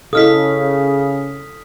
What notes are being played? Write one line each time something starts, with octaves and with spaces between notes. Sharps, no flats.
C#3 E4 A4 D#5 F5 D#6 F6 B6